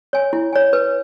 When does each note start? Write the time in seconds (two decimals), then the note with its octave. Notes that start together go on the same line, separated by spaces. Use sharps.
0.13 C#5 G#5
0.33 E4
0.53 C#5 G#5
0.73 B4